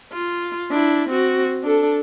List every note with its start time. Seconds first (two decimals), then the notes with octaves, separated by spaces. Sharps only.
0.12 F4
0.71 D4 E4
1.09 C4 F#4
1.64 D4 A4